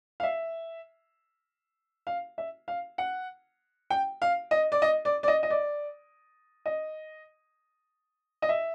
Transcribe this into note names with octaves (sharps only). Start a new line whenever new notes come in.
F5
E5
F5
E5
F5
F#5
G5
F5
D#5
D5
D#5
D5
D5
D#5
D#5
D5
D#5
D#5
E5